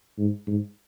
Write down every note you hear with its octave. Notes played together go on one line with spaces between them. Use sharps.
G#2
G#2